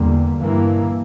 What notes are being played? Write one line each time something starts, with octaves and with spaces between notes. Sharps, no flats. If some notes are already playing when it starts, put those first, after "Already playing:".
Already playing: E2 D3 G3 A#3
G2 E3 A#3